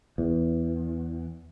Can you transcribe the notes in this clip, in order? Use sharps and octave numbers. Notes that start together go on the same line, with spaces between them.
E2